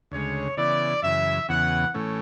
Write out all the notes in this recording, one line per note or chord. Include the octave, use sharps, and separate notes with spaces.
D2 C#3 G#3 C#5
C#3 E3 B3 E4 D5
F#2 C#3 E3 E5
E2 C#3 E3 B3 F#5
A2 E3 A3 C#4